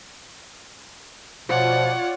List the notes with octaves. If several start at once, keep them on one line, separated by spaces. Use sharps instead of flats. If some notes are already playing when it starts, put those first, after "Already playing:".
B2 F3 F4 C#5 D5 F#5